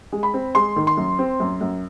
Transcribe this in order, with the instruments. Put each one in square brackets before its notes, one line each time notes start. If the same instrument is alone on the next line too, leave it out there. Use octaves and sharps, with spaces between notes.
[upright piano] G#3
[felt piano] B5
[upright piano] C4
[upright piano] G#3 [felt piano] C6
[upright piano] D#3
[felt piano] C6
[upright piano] F#2
C4
F#2
F#2